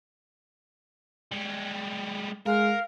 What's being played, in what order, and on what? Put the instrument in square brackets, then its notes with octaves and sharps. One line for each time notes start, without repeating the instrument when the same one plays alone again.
[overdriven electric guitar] G3 G#3
[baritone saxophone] G#3 [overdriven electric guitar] A#4 [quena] F5